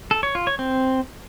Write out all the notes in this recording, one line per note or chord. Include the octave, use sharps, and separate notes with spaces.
A4
C#5
F4
C#5
C4